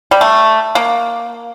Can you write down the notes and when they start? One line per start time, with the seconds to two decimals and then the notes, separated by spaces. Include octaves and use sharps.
0.11 G3
0.21 A3
0.75 A#3